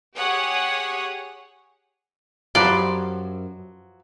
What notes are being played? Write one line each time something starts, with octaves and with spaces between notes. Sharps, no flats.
G4 G#4 C#5 F#5 G#5 D#6
F#2 F3 F#3 G4 B4 C5 D5 F5